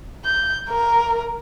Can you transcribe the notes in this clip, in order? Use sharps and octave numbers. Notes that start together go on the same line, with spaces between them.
G6
A#4